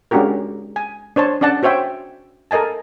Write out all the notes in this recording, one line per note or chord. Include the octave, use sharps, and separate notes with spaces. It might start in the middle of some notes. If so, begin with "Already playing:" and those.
G#3 C#4 D4 F#4 G4 A#4
G#5
D4 C5 C#5 A5
C#4 D4 D5 F#5 A5
F#4 C5 C#5 E5 G5
A4 A#4 D#5 G#5 A5